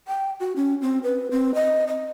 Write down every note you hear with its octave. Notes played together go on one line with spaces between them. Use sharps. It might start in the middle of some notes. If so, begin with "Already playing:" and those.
G5
F#4
C#4
C4
B4
C4
D#5
D#5